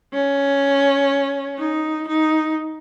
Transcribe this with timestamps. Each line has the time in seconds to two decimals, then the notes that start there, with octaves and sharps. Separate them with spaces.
0.13 C#4
1.59 D#4
2.08 D#4